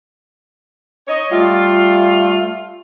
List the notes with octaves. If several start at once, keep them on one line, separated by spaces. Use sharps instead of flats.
C#5 D#5
G3 A3 F4